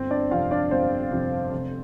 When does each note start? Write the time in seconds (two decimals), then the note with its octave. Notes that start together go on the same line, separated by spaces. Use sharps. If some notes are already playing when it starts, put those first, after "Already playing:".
Already playing: G1 C4 C5
0.11 D4 D5
0.31 F2 C3 F3 F4 F5
0.51 D4 D5
0.71 G1 C4 C5
1.11 F2 C3 F3
1.52 F1